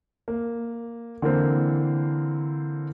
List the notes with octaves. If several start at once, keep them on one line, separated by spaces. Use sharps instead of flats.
A#3
D3 E3 A#3 C4 A#4 C5